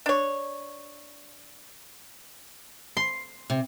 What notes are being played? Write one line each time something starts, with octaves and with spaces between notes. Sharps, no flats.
D4 C#5
C6
C3